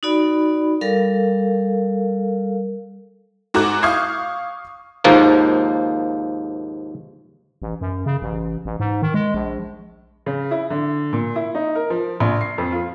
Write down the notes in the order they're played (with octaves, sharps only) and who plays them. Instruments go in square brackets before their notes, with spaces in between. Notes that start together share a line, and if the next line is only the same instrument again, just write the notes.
[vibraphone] D#4 F#4 D5 B5
G3 A4 A#4 F5
[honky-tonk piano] G#2 F#4 A4 A#5 D6 F#6
F5 C#6 D#6 G6 G#6 C7
[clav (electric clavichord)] D#2 G#2 F3 A#3
[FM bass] A1
F#2
C#3
A1
A1
G#2
D#3
G#3
A#1
[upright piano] C#3
E4
D3
A#2
E4
D#4
A#4
F3
A#1
C7
F2
F4